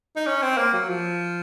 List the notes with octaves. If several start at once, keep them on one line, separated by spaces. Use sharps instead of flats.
D#4
C#4
C4
A#3
F#3
F3